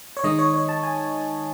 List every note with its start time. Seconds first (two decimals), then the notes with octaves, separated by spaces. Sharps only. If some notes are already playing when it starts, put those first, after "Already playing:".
0.17 C#5
0.24 D#3 G#3 D#4 D#5
0.39 C#5
0.54 C#5
0.69 A5
0.83 G#5